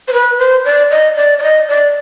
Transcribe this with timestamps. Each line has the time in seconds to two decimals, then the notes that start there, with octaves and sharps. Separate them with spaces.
0.08 C5
0.13 B4
0.39 C5
0.65 D5
0.90 D#5
1.17 D5
1.39 D5
1.43 D#5
1.68 D5